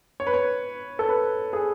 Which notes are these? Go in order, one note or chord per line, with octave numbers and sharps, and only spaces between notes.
C#5
B4
C#5
A4
B4
G#4